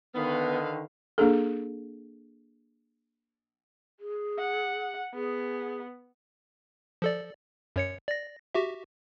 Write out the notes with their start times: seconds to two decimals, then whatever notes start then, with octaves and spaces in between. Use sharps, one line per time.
0.15 D3 D#3 B3 B4 F5
1.18 A#3 D4 G#4 A4
4.00 G#4
4.39 F#5
5.14 B3 G#4
7.02 F3 A4 D5
7.76 F#2 C#5 C#7
8.08 D5 A#6
8.55 F#4 G4 E5